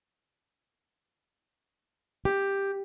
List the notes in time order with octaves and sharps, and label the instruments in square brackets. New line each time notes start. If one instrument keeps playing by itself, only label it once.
[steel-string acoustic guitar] G4